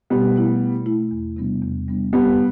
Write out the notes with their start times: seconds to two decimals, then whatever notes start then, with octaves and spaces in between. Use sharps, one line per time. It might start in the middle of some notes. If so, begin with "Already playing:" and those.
0.10 B2 G3 B3
0.36 A3 E4
0.61 B2
0.86 A3 E4
1.11 E2
1.37 C3 G3 B3 D4
1.63 E2
1.88 C3 G3 B3 D4
2.13 F2 G3 B3